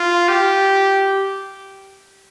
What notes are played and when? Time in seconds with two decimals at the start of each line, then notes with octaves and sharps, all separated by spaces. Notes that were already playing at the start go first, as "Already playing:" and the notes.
Already playing: F4
0.28 G4